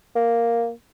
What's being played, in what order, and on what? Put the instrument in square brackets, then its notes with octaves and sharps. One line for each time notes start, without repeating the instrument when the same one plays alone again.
[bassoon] A#3